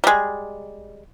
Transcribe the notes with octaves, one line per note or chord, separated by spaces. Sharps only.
G3 G#3